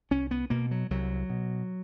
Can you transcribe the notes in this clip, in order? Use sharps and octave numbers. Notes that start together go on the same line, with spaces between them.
C2 C#4
B3
B2 A#3
F#3
C2 F#3
B2